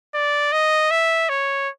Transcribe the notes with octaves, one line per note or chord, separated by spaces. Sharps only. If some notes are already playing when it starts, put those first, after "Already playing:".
D5
D#5
E5
C#5